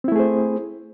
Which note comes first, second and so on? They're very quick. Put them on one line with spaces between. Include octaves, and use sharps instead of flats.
C4 E4 A3 G#4 C5